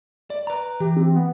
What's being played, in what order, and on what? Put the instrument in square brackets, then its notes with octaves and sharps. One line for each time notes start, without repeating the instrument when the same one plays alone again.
[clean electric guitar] D5
B4 A#5
[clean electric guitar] E3 [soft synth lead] G4
[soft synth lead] C4
B3